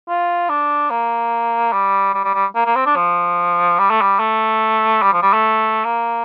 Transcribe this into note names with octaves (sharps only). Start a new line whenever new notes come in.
F4
D4
A#3
G3
G3
G3
G3
A#3
A#3
C4
D4
F3
G3
A3
G3
A3
G3
F3
G3
A3
A#3